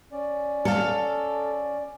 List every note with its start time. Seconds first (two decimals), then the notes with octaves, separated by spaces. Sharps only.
0.12 C#4 D5
0.65 A4 F5